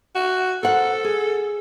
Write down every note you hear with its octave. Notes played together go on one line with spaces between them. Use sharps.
F#4
A4 A#4 C5 F#5
G#4